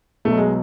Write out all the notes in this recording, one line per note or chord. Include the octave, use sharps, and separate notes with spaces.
B1 B2 F#3 A3
G#3